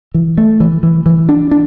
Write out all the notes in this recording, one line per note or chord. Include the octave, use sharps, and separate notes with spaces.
E3
A3
E3
E3
E3
D4
D4